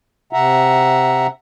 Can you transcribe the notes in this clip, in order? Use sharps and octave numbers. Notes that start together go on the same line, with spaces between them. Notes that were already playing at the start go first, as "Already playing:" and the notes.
C3 E5 F#5 A#5